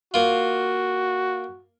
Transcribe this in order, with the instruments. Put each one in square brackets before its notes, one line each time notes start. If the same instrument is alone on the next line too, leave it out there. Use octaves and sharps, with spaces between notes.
[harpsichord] A#3 F4 [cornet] F#4